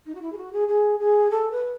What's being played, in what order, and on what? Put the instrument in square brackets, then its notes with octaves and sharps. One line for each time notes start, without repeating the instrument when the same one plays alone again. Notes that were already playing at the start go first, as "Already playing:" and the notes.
[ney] D#4
F#4
E4
G#4
F#4
G#4
G#4
G#4
A4
B4